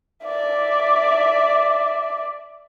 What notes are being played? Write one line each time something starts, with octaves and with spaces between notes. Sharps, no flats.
D5 E5